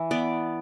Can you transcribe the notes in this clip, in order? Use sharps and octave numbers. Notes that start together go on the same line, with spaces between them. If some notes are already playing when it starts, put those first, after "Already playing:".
Already playing: E3
B3 D5